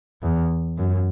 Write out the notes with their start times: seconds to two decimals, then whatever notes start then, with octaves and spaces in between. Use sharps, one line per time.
0.23 E2
0.78 F#2